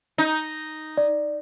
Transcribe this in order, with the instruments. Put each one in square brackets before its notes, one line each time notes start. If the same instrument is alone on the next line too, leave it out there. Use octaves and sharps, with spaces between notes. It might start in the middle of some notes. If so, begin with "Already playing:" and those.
[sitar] D#4
[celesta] D5